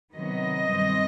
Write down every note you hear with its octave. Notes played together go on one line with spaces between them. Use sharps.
C3 D#3 F#3 B3 D#5
G2 D#3 G3 C4